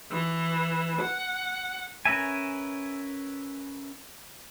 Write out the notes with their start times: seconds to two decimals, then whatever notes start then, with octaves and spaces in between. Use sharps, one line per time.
0.11 E3
1.01 F#5
2.05 C#4 A#4 B4 E5 G#5